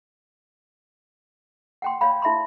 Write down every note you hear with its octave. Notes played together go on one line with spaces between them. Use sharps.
F#5 G5 C6
C#5 D5 F5 B5
E4 E5 B5 C6